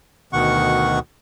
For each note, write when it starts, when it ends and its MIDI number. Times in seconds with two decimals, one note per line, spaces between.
0.33 0.99 38
0.33 0.99 47
0.33 0.99 51
0.33 0.99 78
0.33 0.99 85